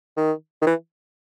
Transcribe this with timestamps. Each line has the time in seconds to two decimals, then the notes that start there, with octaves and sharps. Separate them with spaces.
0.17 D#3
0.62 D#3
0.67 E3